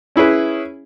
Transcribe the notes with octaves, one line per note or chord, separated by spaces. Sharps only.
C#4 E4 G#4 B4